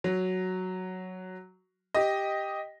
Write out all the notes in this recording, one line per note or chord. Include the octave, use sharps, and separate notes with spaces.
F#3
G4 D#5